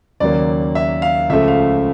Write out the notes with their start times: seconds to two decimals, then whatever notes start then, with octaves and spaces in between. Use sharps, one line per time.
0.20 D#2 C#3 F#3 A#3 D5
0.75 E5
1.02 F5
1.29 C#2 C#3 F3 A3 E5
1.48 F5